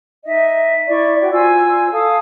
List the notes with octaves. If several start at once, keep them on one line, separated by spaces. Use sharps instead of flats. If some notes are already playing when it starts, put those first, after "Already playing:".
D#4 D#5 E5
E4 D5 C#6
F#4 D5 G5
F4 C5 G#5 E6
A4 F5 A5 D#6